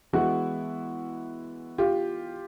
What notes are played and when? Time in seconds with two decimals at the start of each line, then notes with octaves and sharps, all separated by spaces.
0.13 E3 G#3 B3 E4 F#4
1.78 F4 G4